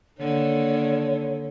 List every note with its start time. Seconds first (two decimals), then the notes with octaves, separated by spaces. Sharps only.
0.19 D3 D#3 A#3 C#5